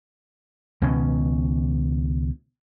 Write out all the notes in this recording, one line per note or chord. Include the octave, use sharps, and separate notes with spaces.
C#2 B2 D#3 C#4